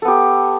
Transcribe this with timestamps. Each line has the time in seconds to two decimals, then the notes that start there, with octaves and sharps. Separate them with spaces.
0.02 A4
0.05 B3
0.08 G4